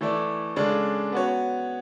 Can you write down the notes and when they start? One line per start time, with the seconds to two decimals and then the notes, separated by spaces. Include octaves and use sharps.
0.01 E3 A3 E4 A4 D5
0.56 C#3 G#3 D4 A4 D5
1.12 B3 F#4 C#5